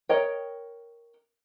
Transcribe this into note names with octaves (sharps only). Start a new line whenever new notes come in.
A#4 C#5 D#5 G5